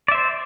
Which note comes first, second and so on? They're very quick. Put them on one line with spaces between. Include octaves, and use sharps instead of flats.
D5 E5 C5